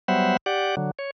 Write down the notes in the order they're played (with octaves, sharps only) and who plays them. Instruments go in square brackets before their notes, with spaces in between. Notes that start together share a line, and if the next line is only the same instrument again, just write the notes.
[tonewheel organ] F#3 G3 B3 C5 E5 F#5
G4 D5 F#5
D3 F#3
C#5